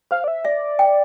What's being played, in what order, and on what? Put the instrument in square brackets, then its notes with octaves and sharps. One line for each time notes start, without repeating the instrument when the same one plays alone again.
[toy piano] C5 [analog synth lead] F5
[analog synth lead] D5
E5
[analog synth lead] D5 [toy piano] E5
[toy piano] G5